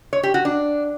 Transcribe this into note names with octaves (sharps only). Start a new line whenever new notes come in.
C#5
G4
F#4
D4